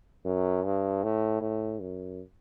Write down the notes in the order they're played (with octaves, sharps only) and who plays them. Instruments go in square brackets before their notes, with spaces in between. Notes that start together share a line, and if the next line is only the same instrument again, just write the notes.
[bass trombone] F#2
G2
A2
A2
F#2